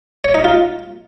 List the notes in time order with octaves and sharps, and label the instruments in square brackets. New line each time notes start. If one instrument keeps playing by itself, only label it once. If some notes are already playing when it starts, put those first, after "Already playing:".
[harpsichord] C#5
D#4
F4